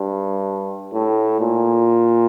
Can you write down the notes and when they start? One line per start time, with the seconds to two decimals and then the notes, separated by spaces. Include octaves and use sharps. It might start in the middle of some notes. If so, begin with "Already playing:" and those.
Already playing: G2
0.93 A2
1.41 A#2